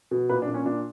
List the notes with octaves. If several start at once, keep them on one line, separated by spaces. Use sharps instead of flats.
B2
A#2 B4
D4
A#2
C#4
A#2 D4